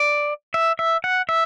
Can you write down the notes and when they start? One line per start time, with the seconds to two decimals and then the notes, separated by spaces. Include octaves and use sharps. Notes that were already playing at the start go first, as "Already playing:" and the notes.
Already playing: D5
0.54 E5
0.79 E5
1.04 F#5
1.29 E5